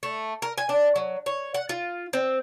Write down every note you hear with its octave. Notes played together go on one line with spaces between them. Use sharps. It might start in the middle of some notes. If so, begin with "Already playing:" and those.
A3
A#4
G#5
D4
F#3
C#5
F#5
F4
C4